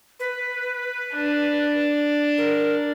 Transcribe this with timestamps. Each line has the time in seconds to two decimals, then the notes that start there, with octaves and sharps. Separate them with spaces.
0.19 B4
1.14 D4
2.37 A#4